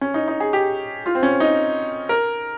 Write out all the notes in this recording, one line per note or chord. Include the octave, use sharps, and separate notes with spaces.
C#4
D#4
D#4
G#4
G4
F4
C4
C#4
D#4
A#4